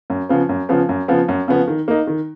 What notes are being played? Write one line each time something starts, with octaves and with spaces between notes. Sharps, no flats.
F#2
C#3 F3 B3
F#2
C#3 F3 B3
F#2
C#3 F3 B3
F#2
C#3 F3 B3
D#3
A#3 D#4
D#3